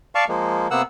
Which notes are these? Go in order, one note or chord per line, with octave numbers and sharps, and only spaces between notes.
D5 F5 A5 C#6
F3 G#3 A#3
C3 A#3 B3 F#5 E6